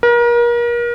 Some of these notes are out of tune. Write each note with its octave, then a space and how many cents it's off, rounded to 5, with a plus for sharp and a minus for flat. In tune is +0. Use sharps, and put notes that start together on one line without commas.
A#4 +35